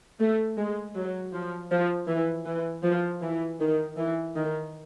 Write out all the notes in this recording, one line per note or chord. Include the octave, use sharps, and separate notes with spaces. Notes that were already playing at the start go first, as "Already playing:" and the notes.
A3
G#3
F#3
F3
F3
E3
E3
F3
E3
D#3
E3
D#3